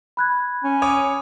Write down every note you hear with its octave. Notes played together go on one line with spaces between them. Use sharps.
B5 F#6 G#6
C#4
C#5 D6 D#6